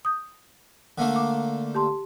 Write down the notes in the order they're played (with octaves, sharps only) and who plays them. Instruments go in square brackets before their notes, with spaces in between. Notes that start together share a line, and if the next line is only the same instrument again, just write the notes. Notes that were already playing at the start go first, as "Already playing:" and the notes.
[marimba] D#6 G6
[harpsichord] D3 A3 A#3
[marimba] D6
G4 A5 C6